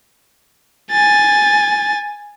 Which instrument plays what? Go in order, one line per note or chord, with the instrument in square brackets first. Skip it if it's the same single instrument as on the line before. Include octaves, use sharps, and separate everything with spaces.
[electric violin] G#5 A6